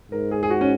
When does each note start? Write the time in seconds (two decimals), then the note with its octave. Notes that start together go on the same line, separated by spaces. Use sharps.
0.12 G#2 A#4
0.31 G#4
0.43 G#4
0.50 F#4
0.61 C#4